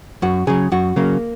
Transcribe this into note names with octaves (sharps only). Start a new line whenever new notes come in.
F#2 F#4
C#3 F#3 G#4
F#2 F#4
C#3 F#3 A#3